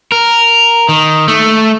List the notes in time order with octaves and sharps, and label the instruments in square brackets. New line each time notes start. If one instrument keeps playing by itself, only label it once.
[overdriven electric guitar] A#4
D#3
A3